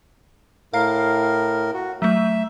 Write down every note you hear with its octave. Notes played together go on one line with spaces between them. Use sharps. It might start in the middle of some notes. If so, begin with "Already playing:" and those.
A2 A#4 F5 F6 C7
F#4
F#3 A3 E5